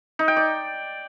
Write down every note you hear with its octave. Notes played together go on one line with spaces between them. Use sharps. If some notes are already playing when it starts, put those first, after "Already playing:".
D#4
G5
D5